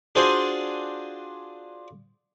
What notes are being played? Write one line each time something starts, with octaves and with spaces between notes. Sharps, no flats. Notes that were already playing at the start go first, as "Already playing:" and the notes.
D4 F4 F#4 G#4 C5 G#5